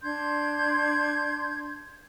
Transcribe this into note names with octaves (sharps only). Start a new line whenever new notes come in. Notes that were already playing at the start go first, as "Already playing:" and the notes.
D4 C6 G6 G#6